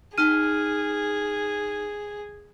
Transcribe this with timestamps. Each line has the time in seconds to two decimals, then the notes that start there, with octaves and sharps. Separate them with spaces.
0.18 D#4 G#4 F6 D#7